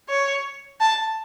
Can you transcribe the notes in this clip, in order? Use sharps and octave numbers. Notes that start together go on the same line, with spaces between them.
C#5
A5